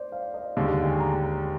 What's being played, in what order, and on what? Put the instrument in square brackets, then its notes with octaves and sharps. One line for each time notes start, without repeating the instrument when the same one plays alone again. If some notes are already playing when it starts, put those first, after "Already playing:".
Already playing: [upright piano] C5 D5
F5
D#5
[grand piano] D#2 D3 G#3 [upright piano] F5
[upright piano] F5
G5
G#5
A#5